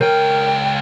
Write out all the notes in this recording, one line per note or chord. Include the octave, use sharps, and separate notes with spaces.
C#2 A#4 C#5 G5 G6